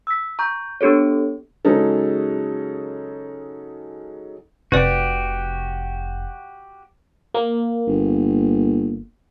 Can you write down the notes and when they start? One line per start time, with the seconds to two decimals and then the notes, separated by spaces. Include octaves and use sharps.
0.07 E6 B6
0.39 A#5 C#6 G6
0.81 B3 D4 G4 A4 C#5
1.65 C#3 F#3 G#3 C#4 D#4 A4
4.72 F1 C3 F#4 G4 B4 D5
7.34 A#3
7.87 G1